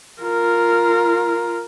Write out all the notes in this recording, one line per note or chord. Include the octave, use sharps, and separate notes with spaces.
F4 A#4